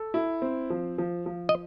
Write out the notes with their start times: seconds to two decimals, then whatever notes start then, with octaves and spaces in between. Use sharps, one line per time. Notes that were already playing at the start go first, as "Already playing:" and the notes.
Already playing: A4
0.14 E4
0.42 C4
0.70 F3
0.98 F3
1.26 F3
1.49 D#5